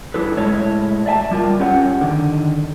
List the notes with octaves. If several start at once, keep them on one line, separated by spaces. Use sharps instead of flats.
G3 D4 E4 A4 B4
A2 G#3 E4 A4 C#5 D#5
D5 E5 G#5 A5
G3 F4 A#4
C#4 F4 G4 C#5 F#5
D3 D#3